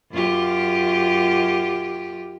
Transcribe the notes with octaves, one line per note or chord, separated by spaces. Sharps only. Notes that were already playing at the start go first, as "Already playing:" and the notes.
F#2 F4 G4